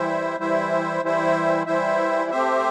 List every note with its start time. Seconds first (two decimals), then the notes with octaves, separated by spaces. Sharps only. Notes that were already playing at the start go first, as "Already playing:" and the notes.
Already playing: E3 G3 E4 C5 E5
0.39 E3 G3 E4 C5 E5
1.02 E3 G3 E4 C5 E5
1.66 E3 G3 E4 C5 E5
2.30 A3 C4 G4 C5 E5